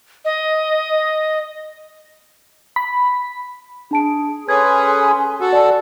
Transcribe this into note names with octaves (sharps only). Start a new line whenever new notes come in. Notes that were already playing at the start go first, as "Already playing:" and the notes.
D#5
B5
D4 G#4 A5 D7
C#4 G#4 A4 B4 G#5 C6 G#6
F#4 A4
D5 A5